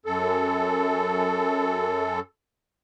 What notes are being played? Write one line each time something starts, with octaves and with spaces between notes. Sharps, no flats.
F#2 A4